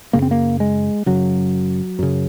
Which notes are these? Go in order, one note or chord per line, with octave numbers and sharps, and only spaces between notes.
F#2 C#3 A#3
C4
A#3
G#3
F#2 C#3 F#3
F#2 C#3